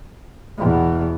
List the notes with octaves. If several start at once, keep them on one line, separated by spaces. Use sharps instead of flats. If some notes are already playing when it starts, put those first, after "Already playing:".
E2 B2